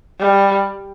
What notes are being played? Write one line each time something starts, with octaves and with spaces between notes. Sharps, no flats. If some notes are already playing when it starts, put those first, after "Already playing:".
G3